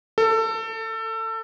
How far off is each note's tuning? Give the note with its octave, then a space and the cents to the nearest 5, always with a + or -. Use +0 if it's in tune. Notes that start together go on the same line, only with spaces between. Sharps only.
A4 +25